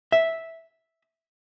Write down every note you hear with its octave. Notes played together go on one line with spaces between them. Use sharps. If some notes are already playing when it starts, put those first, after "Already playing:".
E5